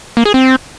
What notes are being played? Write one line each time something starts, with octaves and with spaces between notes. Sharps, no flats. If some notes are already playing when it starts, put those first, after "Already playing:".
A#3
G#4
C4